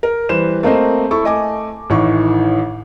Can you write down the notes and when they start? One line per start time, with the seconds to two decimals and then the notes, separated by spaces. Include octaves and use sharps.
0.03 A#4
0.29 E3 G3 B4 C5 E7
0.63 A3 A#3 C4 C5 D#5
1.11 E4 A4 C#6
1.24 A3 D#5 G#5 D6
1.90 A1 A2 D#3 E3 C#6